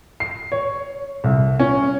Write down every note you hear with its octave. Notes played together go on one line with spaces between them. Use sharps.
C7
C#5
C2
C#4